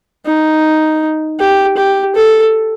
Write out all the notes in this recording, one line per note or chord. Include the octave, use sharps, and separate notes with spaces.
D#4
G4
G4
A4